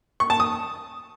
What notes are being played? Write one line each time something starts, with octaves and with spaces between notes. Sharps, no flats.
C#6
A5
D#6